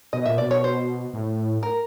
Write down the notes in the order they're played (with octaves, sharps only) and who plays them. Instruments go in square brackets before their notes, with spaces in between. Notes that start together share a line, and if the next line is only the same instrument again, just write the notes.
[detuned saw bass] B2 [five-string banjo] D#5
[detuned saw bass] A#2 [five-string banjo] E5
[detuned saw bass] B2 [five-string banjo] D5
[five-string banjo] C#5
C5
[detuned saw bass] A2
[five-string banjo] A#4